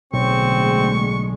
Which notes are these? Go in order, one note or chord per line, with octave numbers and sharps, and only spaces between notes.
B1 A2 D3 G#3 C4 C#6